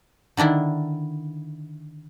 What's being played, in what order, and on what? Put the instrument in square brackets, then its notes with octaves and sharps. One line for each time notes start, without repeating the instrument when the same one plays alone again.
[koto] D3 D#3 D4 E4